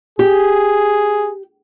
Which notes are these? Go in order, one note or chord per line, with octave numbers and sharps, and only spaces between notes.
G4 G#4